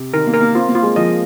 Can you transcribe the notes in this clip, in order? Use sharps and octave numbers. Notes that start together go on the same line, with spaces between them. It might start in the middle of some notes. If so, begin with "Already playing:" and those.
Already playing: C3
D#3 A#4
A#3
A#4
A#3
C4 F4
A#3
F4
G#3
F3 D#5